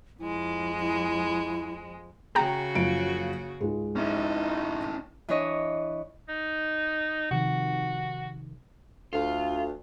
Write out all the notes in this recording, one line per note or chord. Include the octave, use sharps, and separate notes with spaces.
F2 G#3 E4
E4
C#3 F#4 G#4 G5 A#5
F#1 F3 D7
C#2 G#2 G#3
C#4 D#4 E4
E3 D4 C#5 D#5
D#4
C3 D#3 F3 F#4
D2 F4